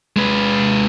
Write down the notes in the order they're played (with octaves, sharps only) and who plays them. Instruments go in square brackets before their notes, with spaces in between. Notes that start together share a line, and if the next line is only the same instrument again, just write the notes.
[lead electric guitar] G#3 B4